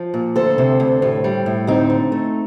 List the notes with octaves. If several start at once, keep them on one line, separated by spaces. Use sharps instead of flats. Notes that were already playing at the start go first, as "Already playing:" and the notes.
Already playing: F3
A#2
D2 A4 C5
C3
D2
A2
G3
A2
D2 C4 D#4
D3
A3